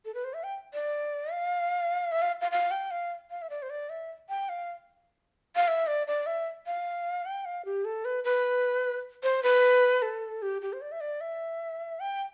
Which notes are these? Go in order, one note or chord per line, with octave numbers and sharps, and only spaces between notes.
A4
B4
C5
E5
G5
D5
F5
E5
F5
F5
F5
G5
F5
F5
E5
D5
C5
D5
E5
G5
F5
F5
E5
D5
D5
E5
F5
G5
F5
G4
A4
B4
B4
C5
B4
A4
G4
G4
C5
D5
E5
D5
E5
G5